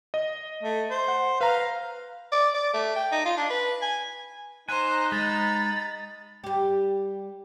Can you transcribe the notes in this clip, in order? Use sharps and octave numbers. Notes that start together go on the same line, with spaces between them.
D#5
A3
C5
F#5
B4 F5 A#5
D5
D5
A3
G5
D#4
F4
D4
B4
G#5
D#4 C5 G#5 A#5 F#6
G#3 A#5 B5 A6
G3 G4